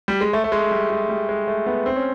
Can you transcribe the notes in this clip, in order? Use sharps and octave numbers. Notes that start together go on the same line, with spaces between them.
G3
G#3
A3
A3
G#3
G3
G#3
G3
G#3
A3
B3
C4
C#4